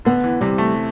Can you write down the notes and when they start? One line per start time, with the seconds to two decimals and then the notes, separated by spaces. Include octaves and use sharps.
0.05 D3 B3
0.24 E3
0.41 C3 G3
0.58 A3